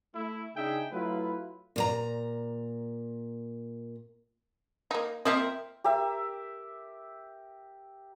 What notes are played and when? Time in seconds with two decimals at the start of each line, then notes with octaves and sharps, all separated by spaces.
0.14 A3 E4
0.55 C#3 D4 D#4 G#4 E5 G5
0.92 F#3 A3 E4 F4 B4
1.76 A#2 C5 A#5
4.91 A#3 D#4
5.25 F3 A#3 C4 A#4 D#5 E5
5.84 G4 A#4 E5